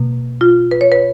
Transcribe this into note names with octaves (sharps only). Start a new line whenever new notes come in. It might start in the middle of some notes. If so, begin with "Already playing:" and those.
Already playing: B2 A#3
F4
B4
C#5
B4